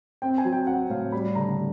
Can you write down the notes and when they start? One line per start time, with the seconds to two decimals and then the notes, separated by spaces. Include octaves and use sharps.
0.22 C4 G5
0.38 G#5
0.45 F#3
0.52 G5
0.67 C4 F#5
0.90 A2 F5
1.12 G3 B5
1.35 D3 A#5
1.58 D3